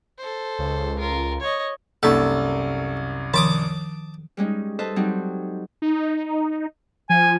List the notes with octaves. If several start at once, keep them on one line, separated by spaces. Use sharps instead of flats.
A4 C5
C#2
F4 A#4
C#5 D#5
C2 F#2 A#3 D#4 A4 C#6
D#3 F3 A5 D6 D#6
G3 G#3 C#4 D#4
A4 B4 C5 D#5 E5 A5
F#3 G3 C4 D#4
D#4
F3 G#5